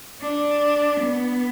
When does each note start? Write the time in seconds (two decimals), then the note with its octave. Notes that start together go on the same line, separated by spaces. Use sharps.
0.22 D4
1.01 B3